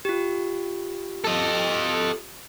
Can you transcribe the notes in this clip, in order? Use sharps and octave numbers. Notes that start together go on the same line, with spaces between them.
F4 G4
A4 D#5